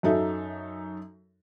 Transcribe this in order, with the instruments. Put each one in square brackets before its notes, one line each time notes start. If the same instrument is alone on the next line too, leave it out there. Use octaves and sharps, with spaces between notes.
[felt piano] F#2 F#3 D#4 A4 E5